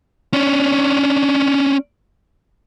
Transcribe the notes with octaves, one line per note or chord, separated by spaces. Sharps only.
C#4 D4